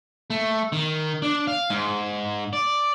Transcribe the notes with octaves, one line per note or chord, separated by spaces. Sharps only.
A3
D#3
D4
F5
G#2
D5